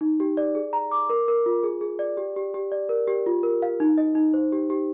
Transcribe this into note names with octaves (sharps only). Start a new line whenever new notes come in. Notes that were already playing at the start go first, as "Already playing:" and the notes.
D#4
G4
D5
G#4
A#5
D6
A#4
A#4
F4
G#4
G#4
D5
G4
G4
G4
D5
A#4
G4
F4
A#4
F5
D#4
D#5
D#4
C5
G4
G4